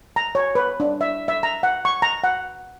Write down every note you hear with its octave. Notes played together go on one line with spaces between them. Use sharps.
A#5
C#5
B4
D4
E5
E5
A#5
F#5
C#6
A#5
F#5